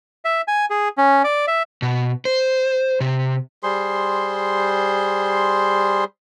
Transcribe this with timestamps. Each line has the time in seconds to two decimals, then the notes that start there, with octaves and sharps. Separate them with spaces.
0.25 E5
0.48 G#5
0.70 G#4
0.98 C#4
1.24 D5
1.48 E5
1.82 B2
2.25 C5
3.00 C3
3.63 G3 G#4 C5 C6